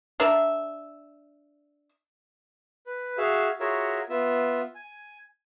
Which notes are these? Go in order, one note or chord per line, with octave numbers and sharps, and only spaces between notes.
D4 A#4 E5
B4
F#4 G#4 E5 F5
F4 F#4 G#4 A#4 C#5 E5
B3 F4 E5
G#5